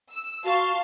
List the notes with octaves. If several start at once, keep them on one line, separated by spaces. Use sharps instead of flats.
E6
F#4 F5 A5 C6